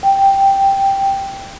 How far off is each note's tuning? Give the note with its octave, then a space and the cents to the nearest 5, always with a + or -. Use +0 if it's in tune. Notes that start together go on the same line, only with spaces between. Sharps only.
G5 +0